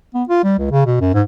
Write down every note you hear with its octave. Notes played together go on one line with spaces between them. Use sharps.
B3
F4
G3
C#2
C#3
B2
F#2
G#2